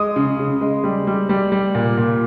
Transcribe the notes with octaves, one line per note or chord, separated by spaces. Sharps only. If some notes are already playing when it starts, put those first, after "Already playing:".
Already playing: G#3 D#6
C#3
C#3
G#3
G3
G3
G3
G3
A#2
A#2